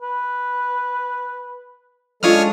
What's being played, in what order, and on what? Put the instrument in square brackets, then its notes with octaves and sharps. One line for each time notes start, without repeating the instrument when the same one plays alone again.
[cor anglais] B4
[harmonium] G#3 A4 [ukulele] C#4 D4 F4 [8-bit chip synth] C#5 D#6 F6